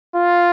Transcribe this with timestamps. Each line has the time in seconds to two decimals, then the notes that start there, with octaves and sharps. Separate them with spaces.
0.16 F4